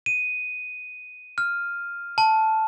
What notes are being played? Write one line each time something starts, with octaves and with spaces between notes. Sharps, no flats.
D#7
F6
A5